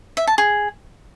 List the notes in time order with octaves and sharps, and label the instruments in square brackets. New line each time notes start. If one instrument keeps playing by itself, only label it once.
[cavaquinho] E5
A5
G#4